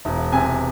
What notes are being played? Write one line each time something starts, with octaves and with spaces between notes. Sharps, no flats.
E1
C3 G#5